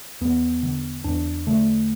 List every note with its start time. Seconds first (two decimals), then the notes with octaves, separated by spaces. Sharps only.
0.21 E2 B3
0.63 D3
1.04 E2 D4
1.47 D3 A3